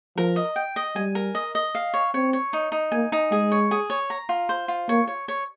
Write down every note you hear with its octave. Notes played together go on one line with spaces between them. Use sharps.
F3 A#4
D#5
G5
D#5
G3 G#5
A#4
D#5
D#5
F5
C#5
C4 C#5
C#5
D#4
D#4
A#3 G#5
D#4
G#3 G#4
C#5
G#4
C#5
A#5
F4
C5
F4
A#3 C#5
C#5
C#5